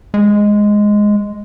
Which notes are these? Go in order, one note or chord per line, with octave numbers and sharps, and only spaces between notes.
G#3